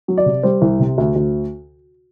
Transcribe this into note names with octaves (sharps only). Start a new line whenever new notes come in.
F#3
D5
C3
G3 C5
C2
C3
D2
D2